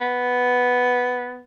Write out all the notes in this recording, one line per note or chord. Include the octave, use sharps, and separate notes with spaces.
B3